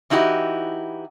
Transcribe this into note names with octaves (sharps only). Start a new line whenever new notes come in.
E3 D#4 E4 F#4 G4